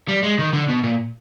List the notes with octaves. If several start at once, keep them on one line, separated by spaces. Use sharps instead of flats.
G3
G#3
D#3
D3
B2
A#2